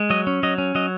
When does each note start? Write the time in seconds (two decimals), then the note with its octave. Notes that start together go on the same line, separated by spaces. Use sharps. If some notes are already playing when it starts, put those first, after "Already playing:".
Already playing: G#3
0.10 F#3 D#5
0.27 C#4
0.43 F#3 D#5
0.58 C#4
0.75 F#3 D#5